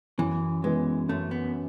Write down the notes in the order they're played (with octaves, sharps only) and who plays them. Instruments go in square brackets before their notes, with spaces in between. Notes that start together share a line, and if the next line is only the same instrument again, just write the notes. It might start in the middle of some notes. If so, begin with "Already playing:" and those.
[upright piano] F#2 [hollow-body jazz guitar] E3
[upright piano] E3 B3 [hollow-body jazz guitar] G#3
[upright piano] F#2 [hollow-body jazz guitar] A3
[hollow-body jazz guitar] B3